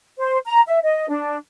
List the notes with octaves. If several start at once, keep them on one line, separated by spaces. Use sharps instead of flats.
C5
A#5
E5
D#5
D4